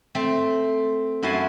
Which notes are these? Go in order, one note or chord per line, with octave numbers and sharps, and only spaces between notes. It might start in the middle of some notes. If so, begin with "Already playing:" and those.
A3 C4
F#2 E4 F#4 G#5 A5 C6